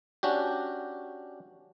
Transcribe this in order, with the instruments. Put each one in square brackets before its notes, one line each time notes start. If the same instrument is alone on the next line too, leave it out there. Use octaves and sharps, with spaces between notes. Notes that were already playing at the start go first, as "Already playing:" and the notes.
[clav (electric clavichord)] C#4 D4 F#4 G4